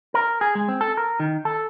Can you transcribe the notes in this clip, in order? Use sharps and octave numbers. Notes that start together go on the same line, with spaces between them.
A#4
G#4
G#3
C4
A4
A#4
D#3
A4